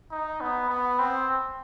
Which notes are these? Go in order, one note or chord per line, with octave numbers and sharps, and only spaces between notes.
D#4
B3
B3
C4